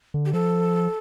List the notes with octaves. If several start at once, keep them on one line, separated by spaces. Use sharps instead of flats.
D3
G4
F3 A4